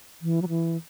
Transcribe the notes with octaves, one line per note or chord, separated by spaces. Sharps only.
E3
F#3
E3